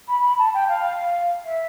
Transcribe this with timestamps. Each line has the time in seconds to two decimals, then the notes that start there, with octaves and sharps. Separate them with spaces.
0.08 B5
0.24 B5
0.38 A5
0.54 G5
0.69 F5
1.45 E5